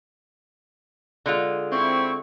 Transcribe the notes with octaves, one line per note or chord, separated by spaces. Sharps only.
D3 G#3 F4
C4 E4 C#6